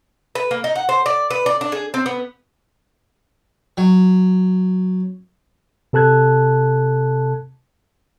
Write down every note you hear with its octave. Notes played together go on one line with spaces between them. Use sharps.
B4
A#3
D#4
F#5
C5
D5
B4
D5
D4
G#4
C4
B3
F#3
C3 A4 A5 F#6 G#6